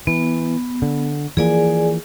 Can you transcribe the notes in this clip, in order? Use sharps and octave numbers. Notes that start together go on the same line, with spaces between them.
E3 B3
D3
E3 F3 A#3 G#4 D5 G#5